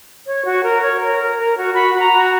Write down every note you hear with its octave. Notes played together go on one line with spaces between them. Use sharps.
C#5
F#4
A#4
C#5
A#4
A#4
A#4
F#4
F#4 B5
F#4 B5
A#5
F#4